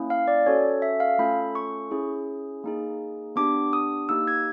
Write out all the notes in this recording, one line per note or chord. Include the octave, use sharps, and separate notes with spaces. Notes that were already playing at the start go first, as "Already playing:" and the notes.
Already playing: A#3 C#4 E4
F5
D5
C#4 F#4 A4 C#5
E5
F5
A3 C#4 F4 A4 B5
C#6
C#4 E4 G#4
A#3 D#4 G#4
B3 D4 G4 D6
D#6
A#3 D#4 G4 E6
G#6